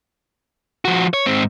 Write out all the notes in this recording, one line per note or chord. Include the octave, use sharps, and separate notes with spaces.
F3 F#4
C#5
G#2 C4